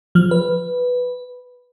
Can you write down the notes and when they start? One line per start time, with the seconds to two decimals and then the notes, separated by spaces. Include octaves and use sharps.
0.15 F3 F6
0.31 B4